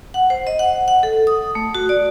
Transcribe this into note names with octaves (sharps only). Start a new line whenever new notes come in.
F#5
C5
D#5
F#5
F#5
A4
D#6
A3
F#4
D5